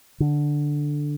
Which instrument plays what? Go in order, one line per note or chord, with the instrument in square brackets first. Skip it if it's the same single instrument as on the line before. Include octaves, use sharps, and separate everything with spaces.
[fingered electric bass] D3